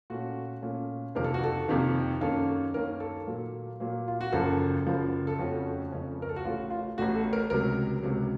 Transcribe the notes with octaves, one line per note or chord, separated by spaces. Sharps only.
A#2 A3 C#4 F#4
A#2 A3 C#4
F2 C3 D#3 A#3 A#4
A4
F#4
A4
F2 C3 D#3 A#3
F#2 D#3 A#3 C#4 A4
F#2 D#3 A#3 C#4 A#4
A4
A#2 F#3 A#3
A#2 F#3 A#3
F4
F#4
F#1 F#2 F3 A4
F#1 F#2 F3
A4
F2 C#3 A3 C#4 F#4
F2 C#3 A3 C#4
A#4
A4
F#4
A1 A2 A3 F4
F4
A1 A2 A3 F#4
A4
A#4
C#2 C3 F#3 A#4
C#2 C3 F#3